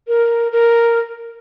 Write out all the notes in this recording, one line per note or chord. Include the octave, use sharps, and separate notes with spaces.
A#4
A#4